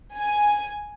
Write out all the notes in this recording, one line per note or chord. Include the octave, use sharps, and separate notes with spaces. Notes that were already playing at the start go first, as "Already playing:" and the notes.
G#5